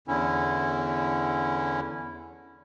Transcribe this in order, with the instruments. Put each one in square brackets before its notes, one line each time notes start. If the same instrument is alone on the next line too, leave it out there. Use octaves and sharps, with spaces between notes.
[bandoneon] E2 D3 C#4 E4